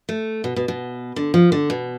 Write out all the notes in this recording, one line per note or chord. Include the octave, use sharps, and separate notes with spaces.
A3
B2
B2
B2
D3
F3
D3
B2